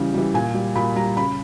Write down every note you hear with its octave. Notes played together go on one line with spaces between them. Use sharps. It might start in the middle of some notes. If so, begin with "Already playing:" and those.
Already playing: C#3 E3 G3
E3 G3
A#2 G#5
G3
A#2 B5
G3 A#5
C#3 B5